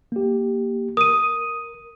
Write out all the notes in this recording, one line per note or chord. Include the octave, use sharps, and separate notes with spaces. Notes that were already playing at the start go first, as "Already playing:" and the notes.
A#3 G4
A#4 D#6 D#7